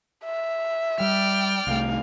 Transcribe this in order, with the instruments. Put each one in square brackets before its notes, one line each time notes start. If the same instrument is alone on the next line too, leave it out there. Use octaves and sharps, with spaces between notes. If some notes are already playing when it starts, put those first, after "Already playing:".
[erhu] E5
[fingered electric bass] G3 [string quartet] D5 G5 F6
[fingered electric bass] C2 A3 [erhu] F5